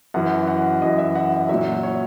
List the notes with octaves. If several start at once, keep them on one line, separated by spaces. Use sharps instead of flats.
F#2 E3 F#5
F#5
F#2 E3 D#5
E5
F#5
F#5
A#2 F#3 E5
C#5